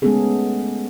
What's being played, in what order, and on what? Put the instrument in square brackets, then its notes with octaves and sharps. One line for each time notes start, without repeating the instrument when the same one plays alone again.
[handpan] G#3 A3 B3 C#4 G#4 A4